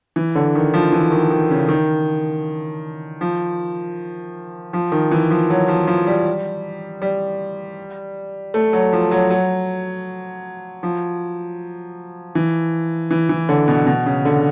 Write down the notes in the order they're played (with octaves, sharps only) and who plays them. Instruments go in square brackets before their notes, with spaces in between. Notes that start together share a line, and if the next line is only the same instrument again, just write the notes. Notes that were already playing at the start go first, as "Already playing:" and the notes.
[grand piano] E3
D3
D#3
F3
E3
D#3
D#3
C#3
D#3
F3
F3
D#3
E3
F3
F#3
F3
F3
G3
G3
A3
F#3
F3
F#3
F#3
F3
E3
E3
E3
D3
B2
B2
C#3
D3